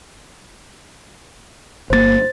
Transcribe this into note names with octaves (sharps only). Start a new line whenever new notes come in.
G1 C#3 A#3 C5 A6